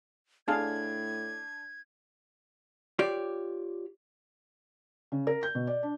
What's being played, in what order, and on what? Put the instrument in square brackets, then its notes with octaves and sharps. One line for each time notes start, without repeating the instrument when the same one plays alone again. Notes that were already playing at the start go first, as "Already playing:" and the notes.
[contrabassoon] A2 [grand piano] D4 [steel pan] G#4 A4 F5 [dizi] G#6
[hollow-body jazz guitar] F4 G4 C#5 D5
[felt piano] C#3
A#4
G6
B2
D5
D4